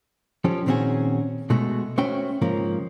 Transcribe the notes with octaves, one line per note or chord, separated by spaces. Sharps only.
F3 C#4 G4 A4
A#2 D#3 C4 C#4 F#4 G#4
B2 G#3 A3 F#4
A3 C#4 F#4 C5 G5
G#2 C#3 F3 A#3